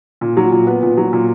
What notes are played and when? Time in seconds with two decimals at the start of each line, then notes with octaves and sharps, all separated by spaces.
0.21 A#2
0.37 F#3
0.52 A#2
0.67 B3
0.83 A#2
0.97 F#3
1.13 A#2